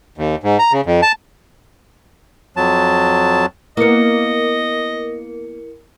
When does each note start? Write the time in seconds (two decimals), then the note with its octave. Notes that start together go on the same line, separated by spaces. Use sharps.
0.18 D#2
0.44 G#2
0.59 A#5
0.72 C#3
0.86 F2
1.02 A5
2.56 F2 F#3 A5
3.77 A#3 B3 E4 A#4 D#5 C#7